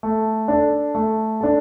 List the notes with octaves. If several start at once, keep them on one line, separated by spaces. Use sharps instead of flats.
A3
D4 A4
A3
D4 A4